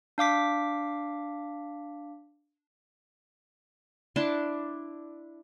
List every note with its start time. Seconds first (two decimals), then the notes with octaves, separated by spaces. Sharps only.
0.18 D4 F5 D6 B6
4.16 D4 E4 A5 C6